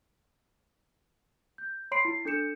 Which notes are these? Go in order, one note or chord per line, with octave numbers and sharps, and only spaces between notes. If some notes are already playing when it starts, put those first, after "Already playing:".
G6
C#5 B5 C6 C7 D7
E4 C7
D4 A4 G6 C#7 E7